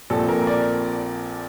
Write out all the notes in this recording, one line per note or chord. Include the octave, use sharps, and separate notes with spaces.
A#1 A#2 F3 C4 A4
A#4
D5